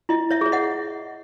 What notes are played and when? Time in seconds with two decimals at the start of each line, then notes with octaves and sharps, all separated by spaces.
0.09 E4 D#5
0.31 C#5 E5
0.41 G#4 C#5
0.52 D#5 F#5